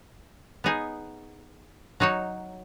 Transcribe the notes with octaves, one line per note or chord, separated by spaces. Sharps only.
B3 D#4 G#4
F#3 D#4 F#4 C#5